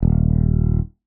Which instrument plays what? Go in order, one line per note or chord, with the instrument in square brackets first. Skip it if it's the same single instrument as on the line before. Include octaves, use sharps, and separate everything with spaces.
[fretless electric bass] D#1